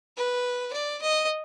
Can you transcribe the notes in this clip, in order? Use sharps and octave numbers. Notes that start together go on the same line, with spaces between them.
B4
D5
D#5